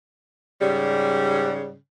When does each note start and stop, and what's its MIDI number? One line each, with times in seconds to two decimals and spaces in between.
0.61 1.74 44
0.61 1.74 49
0.61 1.74 55